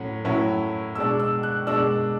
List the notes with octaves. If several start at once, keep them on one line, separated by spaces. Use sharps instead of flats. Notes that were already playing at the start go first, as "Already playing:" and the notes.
Already playing: A2 F#3 C#4
A2 F#3 C#4 E4
B2 G#3 D4 E6
E6
F#6
B2 G#3 D4 E6